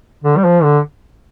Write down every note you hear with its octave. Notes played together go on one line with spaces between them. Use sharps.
D3
G3
F3
D3